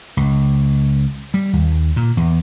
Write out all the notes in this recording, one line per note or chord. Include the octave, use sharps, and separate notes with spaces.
C#2
G3
D#2
A#2
E2